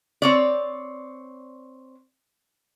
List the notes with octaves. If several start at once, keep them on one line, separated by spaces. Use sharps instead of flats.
C4 C#5 D5